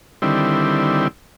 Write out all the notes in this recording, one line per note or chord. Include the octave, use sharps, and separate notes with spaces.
D3 D#3 G3 C4 E4